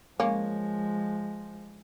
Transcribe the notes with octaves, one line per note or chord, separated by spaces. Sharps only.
F3 G#3 A#3 C#4